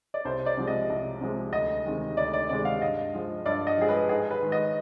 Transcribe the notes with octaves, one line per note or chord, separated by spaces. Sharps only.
D5
C2 C5
D5
C3 F3 G#3
D#5
C2
C3 F3 G#3
D2 D#5
C3 D#3 G#3
D2 D5
D5
C3 D#3 G#3 D5
F5
G2 D#5
F3 G#3
G2 D5
D#5
F3 G#3 G#4
B4
G#2 G#4
B4
D#3 G#3
D#5